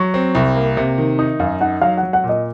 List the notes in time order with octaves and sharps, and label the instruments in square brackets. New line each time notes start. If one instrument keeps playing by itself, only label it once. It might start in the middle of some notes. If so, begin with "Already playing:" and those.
Already playing: [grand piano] F#3 [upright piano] C#6
[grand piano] C4
C2
A#3
C3
D#3
[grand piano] D#4 [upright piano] D#6
[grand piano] F#2 [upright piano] F5
[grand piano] D#4 [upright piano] F#5
[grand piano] F#3 [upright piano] F5
[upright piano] F#5
[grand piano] F#3
[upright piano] F#5
[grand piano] A#2
[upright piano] D#5